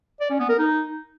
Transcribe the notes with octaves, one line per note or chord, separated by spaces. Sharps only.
D5
C#4
B3
A#4
D#4